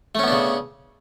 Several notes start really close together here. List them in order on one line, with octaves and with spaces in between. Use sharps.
A3 C#4 B3 D4 C#3